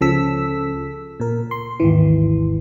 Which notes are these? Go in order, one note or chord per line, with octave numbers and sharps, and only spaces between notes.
C#2 C#3 F3 A4 E6 B6
A#2 A#4
C6
G#1 D#2 E3